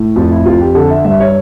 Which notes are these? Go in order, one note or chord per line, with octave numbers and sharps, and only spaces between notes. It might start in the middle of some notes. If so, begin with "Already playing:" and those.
Already playing: A2
F2 F4
E4
F2 F4
G4
D3 A4
E5
G2 E5
C#5